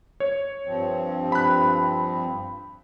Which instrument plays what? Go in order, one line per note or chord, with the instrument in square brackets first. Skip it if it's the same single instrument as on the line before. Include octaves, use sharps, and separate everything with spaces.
[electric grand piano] C#5
[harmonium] G2 F3 C4
[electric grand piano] B5 F#6